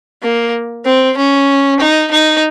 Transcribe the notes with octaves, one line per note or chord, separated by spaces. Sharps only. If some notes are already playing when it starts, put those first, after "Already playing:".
A#3
C4
C#4
D#4
D#4